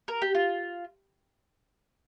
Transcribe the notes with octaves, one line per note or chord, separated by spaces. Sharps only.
A#4
G4
F4